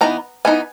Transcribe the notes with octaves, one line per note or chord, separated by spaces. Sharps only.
E3 B3 D#4 A#5
E3 B3 D#4 G#5